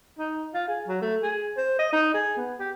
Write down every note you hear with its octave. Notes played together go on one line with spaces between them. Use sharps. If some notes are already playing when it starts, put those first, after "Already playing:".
D#4
F4
G#4
F#3
A3
G#4
C5
D#5
D#4
G#4
B3
G4